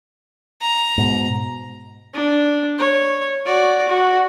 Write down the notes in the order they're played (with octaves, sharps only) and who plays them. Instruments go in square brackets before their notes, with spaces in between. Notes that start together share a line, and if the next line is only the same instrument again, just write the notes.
[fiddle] A#5
[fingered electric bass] G#2 B2
[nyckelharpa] D4
C#5
F#4 D5
F#4